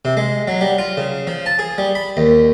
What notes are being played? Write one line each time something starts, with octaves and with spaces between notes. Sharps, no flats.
C3
G#3
F#3
G3
F4
C#3
F3
A5
G#4
G3
B5
D#2